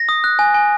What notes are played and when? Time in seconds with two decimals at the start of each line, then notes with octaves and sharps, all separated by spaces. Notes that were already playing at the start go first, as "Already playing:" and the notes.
Already playing: A#6
0.09 D#6
0.24 F#6
0.39 G#5
0.54 G#5